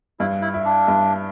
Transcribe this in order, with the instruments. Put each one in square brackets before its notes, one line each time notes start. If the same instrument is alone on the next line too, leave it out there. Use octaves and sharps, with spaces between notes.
[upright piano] G2 [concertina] E4
[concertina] E4
[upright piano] E4
[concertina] D4
[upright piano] G2